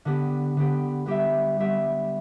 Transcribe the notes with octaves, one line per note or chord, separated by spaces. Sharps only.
D3 B3 G4
D3 B3 G4
G3 B3 G4 E5
G3 B3 G4 E5